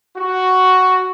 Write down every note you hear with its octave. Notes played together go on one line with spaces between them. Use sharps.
F#4